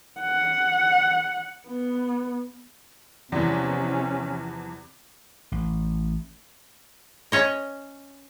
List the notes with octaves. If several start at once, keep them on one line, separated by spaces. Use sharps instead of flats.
F#5
B3
E2 C3 E3 F3 C#4
A1
C#4 C#5 D#5